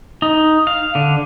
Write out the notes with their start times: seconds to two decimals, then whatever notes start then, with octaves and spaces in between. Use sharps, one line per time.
0.22 D#4
0.67 F5
0.95 D3